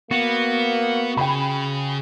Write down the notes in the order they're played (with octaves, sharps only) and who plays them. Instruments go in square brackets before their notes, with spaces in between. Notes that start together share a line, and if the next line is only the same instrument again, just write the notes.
[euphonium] A#3 [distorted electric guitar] B3 [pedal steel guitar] F#4
[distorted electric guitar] C#3 [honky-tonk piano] G5 B5